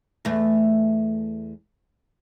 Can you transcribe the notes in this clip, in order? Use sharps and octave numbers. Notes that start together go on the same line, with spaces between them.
E2 A3